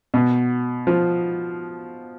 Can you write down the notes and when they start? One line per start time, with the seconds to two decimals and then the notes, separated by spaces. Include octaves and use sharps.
0.14 B2
0.87 F3